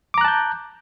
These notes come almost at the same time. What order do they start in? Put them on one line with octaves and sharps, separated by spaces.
D6 A#5 F#6 A5 G6